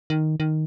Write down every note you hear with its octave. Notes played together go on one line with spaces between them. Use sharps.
D#3
D#3